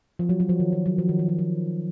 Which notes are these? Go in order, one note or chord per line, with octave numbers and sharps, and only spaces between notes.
F3
F#3
F#3
F3
D#3
F3
F#3
F3
D#3
F3
F#3
F3